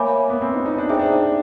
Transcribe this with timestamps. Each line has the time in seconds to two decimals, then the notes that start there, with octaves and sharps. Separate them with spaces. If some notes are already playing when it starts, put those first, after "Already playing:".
Already playing: A#3 C#5 E5 G#5 B5 D6
0.30 B3
0.42 C4
0.54 D#4
0.66 D#4
0.78 D4
0.89 D#4 G#4 C5 E5 G5
0.99 D4
1.10 D#4